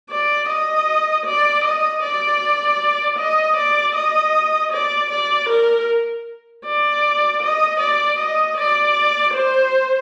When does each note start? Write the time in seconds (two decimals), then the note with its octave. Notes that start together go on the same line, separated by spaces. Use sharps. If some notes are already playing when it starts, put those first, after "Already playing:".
0.10 D5
0.49 D#5
1.26 D5
1.64 D#5
2.03 D5
3.19 D#5
3.57 D5
3.95 D#5
4.72 D5
5.11 D5
5.49 A#4
6.65 D5
7.42 D#5
7.81 D5
8.19 D#5
8.57 D5
9.34 C5